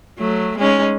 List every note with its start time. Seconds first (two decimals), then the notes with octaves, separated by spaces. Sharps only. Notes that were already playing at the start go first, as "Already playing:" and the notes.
0.18 F#3 A3
0.58 G#3 C#4 D#4